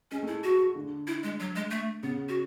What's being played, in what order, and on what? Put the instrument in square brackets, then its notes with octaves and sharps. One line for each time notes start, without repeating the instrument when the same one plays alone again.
[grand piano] G#3 [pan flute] C#4
[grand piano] A3
[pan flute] E4
F#4
[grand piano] D3
[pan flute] E4
G#3
F#3
G#3
A3
[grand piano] C#3 [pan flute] B3
[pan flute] F#4